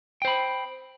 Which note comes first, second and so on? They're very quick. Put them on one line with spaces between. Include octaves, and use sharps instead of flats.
G5 C5 B5